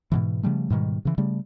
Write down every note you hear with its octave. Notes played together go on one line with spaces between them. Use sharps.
G#2 B2 E3
C#3 F3 G3 A3
G#2 B2 D#3 G3
C#3 E3
C#3 G3 A3